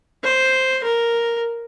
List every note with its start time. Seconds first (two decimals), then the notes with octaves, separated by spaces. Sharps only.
0.23 C5
0.84 A#4